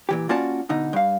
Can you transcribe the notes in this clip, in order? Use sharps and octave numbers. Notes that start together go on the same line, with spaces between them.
A#2 E3 G4
A#3 C#4 F4 F#4 D5 A5
B2 D3 D#4
G2 F5